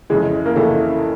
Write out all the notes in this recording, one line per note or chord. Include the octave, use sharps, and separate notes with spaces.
F2 C#3 E3 G#3
A#3
F2 C#3 E3 A3